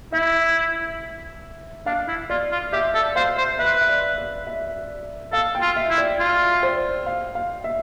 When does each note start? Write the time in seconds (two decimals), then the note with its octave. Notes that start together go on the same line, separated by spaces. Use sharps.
0.12 E4 E5
1.86 D4 F5
2.08 E4
2.30 F4 D5
2.52 F4
2.73 G4 E5
2.94 A4
3.16 C5 F5
3.37 C5
3.59 B4 E5
3.81 E5
3.89 D5
4.18 D5
4.47 E5
5.33 A4 F5
5.55 G5
5.61 F4
5.76 E5
5.90 E4
5.98 D5
6.19 F4
6.63 C5
7.06 F5
7.35 F5
7.64 E5